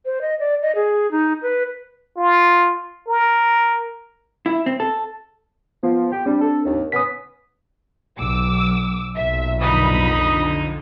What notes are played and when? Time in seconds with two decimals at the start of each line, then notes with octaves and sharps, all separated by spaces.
0.05 C5
0.21 D#5
0.40 D5
0.62 D#5
0.75 G#4
1.11 D#4
1.42 B4
2.17 F4
3.07 A#4
4.46 E4
4.66 C4
4.80 A4
5.83 F3 B3
6.12 G4
6.26 G3 C4 D4
6.41 A4
6.65 D#2
6.92 B3 C#4 D#6 B6
8.18 B1 D6 E6
9.16 B1 A#2 E5
9.60 F2 D3 D#4 B5 D#6